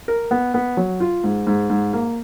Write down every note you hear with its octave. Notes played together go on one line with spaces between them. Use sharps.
A#4
B3
B3
F#3
F4
G#2
G#2
G#2
A#3